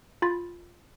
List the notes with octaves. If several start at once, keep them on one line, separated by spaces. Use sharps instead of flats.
F4 B5 A6